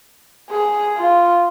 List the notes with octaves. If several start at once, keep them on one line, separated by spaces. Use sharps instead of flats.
G#4
F4